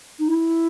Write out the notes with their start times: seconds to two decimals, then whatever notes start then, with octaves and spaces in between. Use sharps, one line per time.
0.19 D#4
0.28 E4